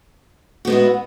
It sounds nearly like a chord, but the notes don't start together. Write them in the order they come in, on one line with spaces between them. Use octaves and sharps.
F#4 B3 G#3 E4